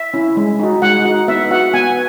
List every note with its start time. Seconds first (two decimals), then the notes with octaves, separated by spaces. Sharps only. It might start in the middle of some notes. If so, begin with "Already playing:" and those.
Already playing: E5
0.14 C#4 E4
0.37 G#3
0.59 D#4 F#4
0.82 G#3 F#5
1.05 D#4 F#4
1.28 B3 E5
1.51 F#4 F#5
1.74 B3 G#5